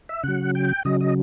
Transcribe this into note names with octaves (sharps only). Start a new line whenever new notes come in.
E5
C#3 F#3 F#5
G5
C#3 F#3 D#5
D#5